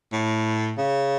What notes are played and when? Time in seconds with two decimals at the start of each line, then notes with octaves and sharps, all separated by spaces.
0.13 A2
0.78 C#3